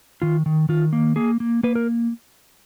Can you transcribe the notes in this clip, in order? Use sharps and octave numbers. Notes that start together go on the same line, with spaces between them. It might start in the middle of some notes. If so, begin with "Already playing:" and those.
D#3 F4
D#3
D#3 F4
A#3
A#3 G#4
A#3
A#3 B4
A#4